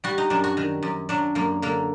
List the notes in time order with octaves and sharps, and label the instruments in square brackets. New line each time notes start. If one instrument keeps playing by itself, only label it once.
[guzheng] G3 F#4
D#4
F#2 D4
F#4
D#3
F#2
F#3 D4
F#2 A#3
D3 A#3